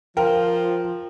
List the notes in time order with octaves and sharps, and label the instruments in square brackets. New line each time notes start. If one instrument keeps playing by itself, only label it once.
[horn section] F3 [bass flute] F4 [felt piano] A#4 [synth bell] G5